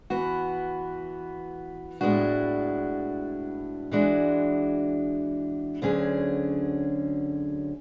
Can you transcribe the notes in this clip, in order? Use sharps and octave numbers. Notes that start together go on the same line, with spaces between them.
E3 B3 F#4
A2 G#3 B3 D4 F#4
E3 G#3 D4 F#4
D2 D3 F#3 C#4 G#4